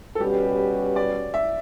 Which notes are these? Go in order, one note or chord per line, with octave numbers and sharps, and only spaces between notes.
A4
B2 G3 C#4 F#4 G4 B4
D5
E5